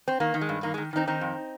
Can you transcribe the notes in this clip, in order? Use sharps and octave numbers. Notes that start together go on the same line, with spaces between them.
C4
D#3 A#3
D#3
G#3
G2
D#3 A#3
G#3
D#3
D#3 C4 D#4
D#3 C4 D#4
F2